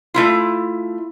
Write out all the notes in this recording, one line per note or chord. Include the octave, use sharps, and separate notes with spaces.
A3 E4 F4